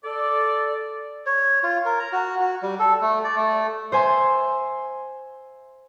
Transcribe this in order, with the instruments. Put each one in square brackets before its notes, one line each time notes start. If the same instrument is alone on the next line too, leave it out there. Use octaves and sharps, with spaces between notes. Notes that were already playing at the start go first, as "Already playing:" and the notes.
[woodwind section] A4 D5
[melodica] C#5
F4
A#4
A#5
F#4
F#4
G3
A4
A3
D5
A3
[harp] C5 E5 G#5 C6